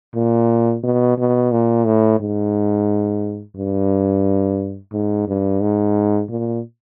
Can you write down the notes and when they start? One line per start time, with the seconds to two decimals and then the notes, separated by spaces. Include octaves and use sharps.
0.15 A#2
0.84 B2
1.18 B2
1.52 A#2
1.86 A2
2.20 G#2
3.56 G2
4.93 G#2
5.28 G2
5.61 G#2
6.30 A#2